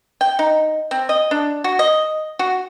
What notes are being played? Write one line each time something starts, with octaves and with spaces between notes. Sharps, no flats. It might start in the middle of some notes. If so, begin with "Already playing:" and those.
G5
D#4
C4
D#5
D4
F#4
D#5
F#4